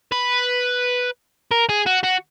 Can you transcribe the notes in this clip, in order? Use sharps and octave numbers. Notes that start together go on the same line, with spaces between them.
B4
A#4
G#4
F#4
F#4